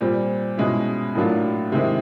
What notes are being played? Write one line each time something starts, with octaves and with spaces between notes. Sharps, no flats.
A#2 G3 C4
B2 G#3 C#4 E4
A2 F#3 A#3 D4 F4
C3 D#3 G#3 C4 E4